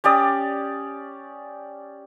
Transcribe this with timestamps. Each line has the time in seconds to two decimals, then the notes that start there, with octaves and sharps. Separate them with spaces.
0.04 C#4 G4 D5 D#6